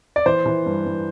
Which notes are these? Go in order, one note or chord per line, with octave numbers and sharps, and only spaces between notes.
D5
E3 C5
E3
G2
G2